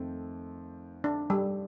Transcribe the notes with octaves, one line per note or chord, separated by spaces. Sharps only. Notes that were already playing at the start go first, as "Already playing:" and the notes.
Already playing: F2 D#3 A3 C4
D4
G3